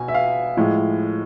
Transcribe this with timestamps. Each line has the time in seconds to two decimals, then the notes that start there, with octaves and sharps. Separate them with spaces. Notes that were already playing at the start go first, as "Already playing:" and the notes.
Already playing: B2 G#5
0.08 E5
0.14 F5
0.57 A2 F3 G#3